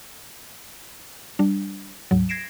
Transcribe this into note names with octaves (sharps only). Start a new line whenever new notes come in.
G3 D4
D2 G#2 F#3
G#6 A#6 C7 D7 E7